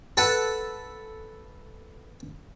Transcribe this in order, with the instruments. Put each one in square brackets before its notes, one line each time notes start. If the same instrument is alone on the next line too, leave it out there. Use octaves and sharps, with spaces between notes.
[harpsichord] A4 B4 F#5